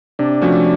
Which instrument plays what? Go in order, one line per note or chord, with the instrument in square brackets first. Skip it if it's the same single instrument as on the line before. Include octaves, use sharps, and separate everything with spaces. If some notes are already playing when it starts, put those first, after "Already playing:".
[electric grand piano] C3 [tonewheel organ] D4
[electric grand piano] F3 A3 C#4 F#4